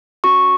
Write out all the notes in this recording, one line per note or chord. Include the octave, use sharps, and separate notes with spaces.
C#4 F#4 C#6